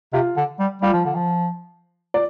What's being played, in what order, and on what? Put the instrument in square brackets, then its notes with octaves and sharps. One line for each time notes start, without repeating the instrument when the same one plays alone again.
[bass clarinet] C3 [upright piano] F4 F5
[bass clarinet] D3
G3
[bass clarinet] G3 [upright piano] F4 F5
[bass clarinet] F3
D3
F3
[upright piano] D5